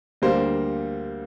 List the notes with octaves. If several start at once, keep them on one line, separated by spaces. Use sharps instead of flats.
D2 D3 G3 A#3 C5